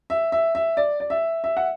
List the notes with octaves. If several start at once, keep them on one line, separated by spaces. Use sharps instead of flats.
E5
E5
E5
D5
D5
E5
E5
F#5